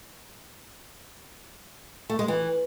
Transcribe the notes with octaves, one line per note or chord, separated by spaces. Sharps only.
A3
G#3
E3